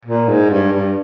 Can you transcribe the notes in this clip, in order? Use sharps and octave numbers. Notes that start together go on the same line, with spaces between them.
A#2
G#2
G2
G2